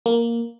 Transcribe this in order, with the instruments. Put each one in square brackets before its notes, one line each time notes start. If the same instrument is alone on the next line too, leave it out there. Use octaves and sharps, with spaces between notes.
[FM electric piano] A#3